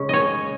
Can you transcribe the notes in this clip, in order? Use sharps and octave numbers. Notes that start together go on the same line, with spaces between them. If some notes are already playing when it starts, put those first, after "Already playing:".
Already playing: C#3 G#3 C#4
C#5 D#5